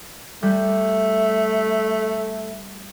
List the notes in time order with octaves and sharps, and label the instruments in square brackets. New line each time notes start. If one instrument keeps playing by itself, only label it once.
[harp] G3 F#6 G6 [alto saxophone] A3